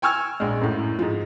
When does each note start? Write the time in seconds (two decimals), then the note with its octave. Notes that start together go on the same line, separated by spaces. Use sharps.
0.02 G5 G#5 C#6 E6 F6 G#6
0.40 A#1 G#3
0.61 F#2 A2
0.99 G#2 F3